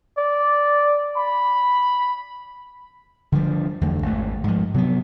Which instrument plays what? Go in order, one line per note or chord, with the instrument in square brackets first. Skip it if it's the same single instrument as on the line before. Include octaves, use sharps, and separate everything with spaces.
[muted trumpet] D5
B5
[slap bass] D3 F3 G3
E2 D3 A3
G#1 A3
G#2 F3
C3 F#3 A3 B3